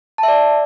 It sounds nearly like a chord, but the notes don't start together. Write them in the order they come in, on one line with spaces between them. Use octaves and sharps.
A5 E5 D5